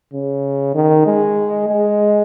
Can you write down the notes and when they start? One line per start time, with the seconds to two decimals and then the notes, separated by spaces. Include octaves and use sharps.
0.14 C#3
0.75 D#3
1.06 G#3
1.68 G#3